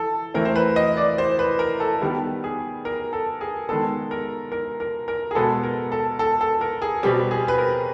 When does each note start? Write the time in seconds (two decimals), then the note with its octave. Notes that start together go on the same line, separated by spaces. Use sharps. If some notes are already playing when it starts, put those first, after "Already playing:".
Already playing: E3 A4
0.34 E3 A3 C4 A#4
0.45 C5
0.56 B4
0.76 D#5
0.97 D5
1.18 C5
1.39 B4
1.59 A#4
1.80 A4
2.02 D#3 G3 B3
2.44 G#4
2.85 A#4
3.13 A4
3.41 G#4
3.69 D#3 G#3 B3 A4
4.11 A#4
4.52 A#4
4.80 A#4
5.08 A#4
5.31 G#4
5.35 B2 G#3 B3 A4
5.63 A#4
5.92 A4
6.19 A4
6.41 A4
6.61 A#4
6.82 G#4
7.03 B2 G3 C4 G4
7.31 G#4
7.48 B4
7.58 A#4